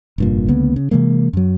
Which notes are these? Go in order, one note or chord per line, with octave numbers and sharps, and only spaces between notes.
F1 G2 A#2
C#2 D3 A#3 B3
C#3
C3 E3 G#3 A#3
F#2 F#3